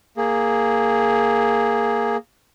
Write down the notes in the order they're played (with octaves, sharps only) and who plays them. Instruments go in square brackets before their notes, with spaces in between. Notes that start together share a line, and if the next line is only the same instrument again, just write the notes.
[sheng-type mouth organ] A#3 G#4